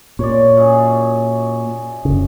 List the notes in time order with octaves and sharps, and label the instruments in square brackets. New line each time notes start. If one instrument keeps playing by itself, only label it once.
[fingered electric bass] A#2 [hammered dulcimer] C#5 D5
[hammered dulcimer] F#2 G#4
[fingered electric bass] F#1 C#3